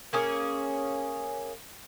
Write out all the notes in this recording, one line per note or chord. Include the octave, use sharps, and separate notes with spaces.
A#3 C#4 G#4